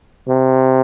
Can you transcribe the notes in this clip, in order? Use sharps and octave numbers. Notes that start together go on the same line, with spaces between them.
C3